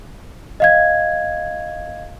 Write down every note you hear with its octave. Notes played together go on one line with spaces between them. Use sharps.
D#5 F5 G#6